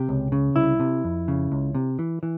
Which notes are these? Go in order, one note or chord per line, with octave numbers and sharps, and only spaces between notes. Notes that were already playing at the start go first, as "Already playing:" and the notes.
Already playing: C3 G4
C#2
C#3
C2 E4
C3
F2
C#3
C#2
C3
E3
E3